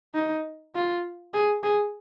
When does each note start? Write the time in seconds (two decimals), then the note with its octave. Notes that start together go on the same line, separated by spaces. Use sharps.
0.15 D#4
0.75 F4
1.34 G#4
1.63 G#4